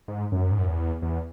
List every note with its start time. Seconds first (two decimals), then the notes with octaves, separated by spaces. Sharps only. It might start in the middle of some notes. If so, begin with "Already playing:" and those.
0.08 G#2
0.32 F#2
0.51 G#2
0.58 F#2
0.67 E2
1.02 E2